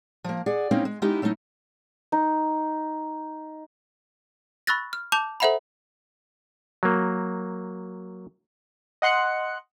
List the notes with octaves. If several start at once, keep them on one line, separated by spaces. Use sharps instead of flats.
F3 A#3
G#4 D5 F#5
A#3 C4 C#4 D#4 E4
G#3
G#3 B3 C#4 D#4 E4 G4
F#3 A3 C#4 D#4 E4
D#4
B5 C#6 E6 F#6 A6 A#6
F6
A5 D6 G6 F7
A4 C5 E5 F#5 A#5 B5
F#3 A#3
D#5 F#5 C6 F#6 C#7